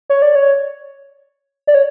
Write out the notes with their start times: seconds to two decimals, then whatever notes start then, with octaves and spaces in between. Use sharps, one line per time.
0.10 C#5
0.22 D5
0.35 C#5
1.67 D5
1.75 C#5